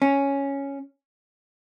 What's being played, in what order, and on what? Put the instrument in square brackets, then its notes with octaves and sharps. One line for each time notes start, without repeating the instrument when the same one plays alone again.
[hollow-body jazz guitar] C#4